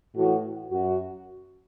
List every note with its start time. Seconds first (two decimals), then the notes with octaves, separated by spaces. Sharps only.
0.14 A2 E3 F#4
0.72 F#2 F#4